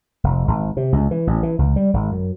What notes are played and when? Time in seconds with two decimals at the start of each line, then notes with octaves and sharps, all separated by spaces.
0.24 F1
0.48 G#1
0.77 C3
0.92 C#2
1.11 E3
1.27 A1
1.43 E3
1.59 C#2
1.76 G3
1.94 G#1
2.12 F#2